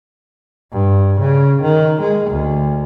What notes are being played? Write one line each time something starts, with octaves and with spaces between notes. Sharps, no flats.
G2
C#3
D#3
G#3
D2